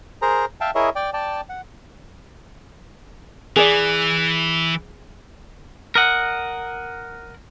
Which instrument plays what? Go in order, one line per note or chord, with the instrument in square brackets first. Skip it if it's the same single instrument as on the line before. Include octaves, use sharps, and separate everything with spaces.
[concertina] G#4 A#4 C5 A#5
E5 F5 G5 A5
E4 G#4 A#4 C#5 D#5 E5
D5 G5
D5 G5 A5
F#5
[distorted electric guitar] E3 [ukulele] G#4 D5
[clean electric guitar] A#4 D#5 F#5